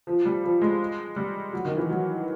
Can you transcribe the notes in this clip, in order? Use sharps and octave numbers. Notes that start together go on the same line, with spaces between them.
F3
G3
F3
G#3
G3
F#3
D#3
E3
F#3